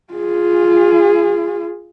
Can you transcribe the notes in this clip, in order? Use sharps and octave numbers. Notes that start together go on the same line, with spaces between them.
F4 G#4